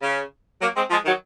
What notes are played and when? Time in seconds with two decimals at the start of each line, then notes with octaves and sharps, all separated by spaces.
0.02 C#3
0.61 F#3 A#3
0.76 G#3 C4
0.91 F3 G#3
1.06 D#3 F#3